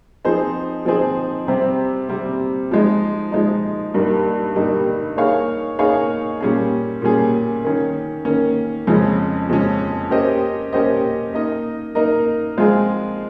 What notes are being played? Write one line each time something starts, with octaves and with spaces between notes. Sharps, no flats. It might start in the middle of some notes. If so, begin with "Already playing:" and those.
F3 C4 D#4 G#4 C5
F3 C4 D#4 G#4 C5
C3 G3 C4
C3 G3 C4
F3 G#3 D#4
F3 G#3 D#4
G2 G3 A#3 D#4
G2 G3 A#3 D#4
A#3 D#4 G#4 C#5 F5
A#3 D#4 G#4 C#5 F5
A#2 G3 C#4 G#4
A#2 G3 C#4 G#4
D#3 A#3 C#4
D#3 A#3 C#4
F2 C#3 F3 G#3 C#4
F2 C#3 F3 G#3 C#4
A#3 C#4 G4 C5 D#5
A#3 C#4 G4 C5 D#5
A#3 D#4 A#4 D#5
A#3 D#4 A#4 D#5
F3 G#3 C4 F4 G#4